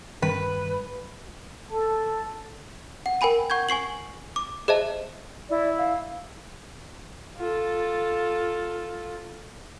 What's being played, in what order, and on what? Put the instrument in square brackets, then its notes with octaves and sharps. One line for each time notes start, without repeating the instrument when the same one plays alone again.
[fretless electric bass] G2 [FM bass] D#3 [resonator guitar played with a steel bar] B4
[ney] A4 [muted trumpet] A5
[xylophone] F#5
A#4 G5 G#5 B5 D#7
F#5 C#6 G6 G#6
G#5 C#6 C7 F#7
D6
G#4 C5 D#5 E5 A5
[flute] E4 [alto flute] D5
[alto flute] F5
[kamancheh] F4 A4